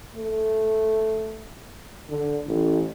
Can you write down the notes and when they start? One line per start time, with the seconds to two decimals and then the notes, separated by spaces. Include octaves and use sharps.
0.15 A3
2.10 D3
2.46 A1